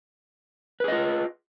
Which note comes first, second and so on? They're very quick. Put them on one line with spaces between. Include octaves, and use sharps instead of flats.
B4 G#4 D#5 F4